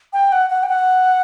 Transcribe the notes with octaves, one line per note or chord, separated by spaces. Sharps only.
G5
F#5
F#5
G5
F#5